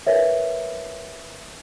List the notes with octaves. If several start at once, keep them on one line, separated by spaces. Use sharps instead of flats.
A#4 B4 C#5 E5